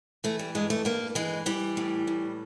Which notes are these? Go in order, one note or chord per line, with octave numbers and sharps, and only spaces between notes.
E3 A3
G3
G2 G#3
A3
G2 A#3
E3 G#3
E3 G3
A2
A2